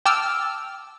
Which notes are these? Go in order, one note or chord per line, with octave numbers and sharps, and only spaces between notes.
G5 A5 D6 E6 F6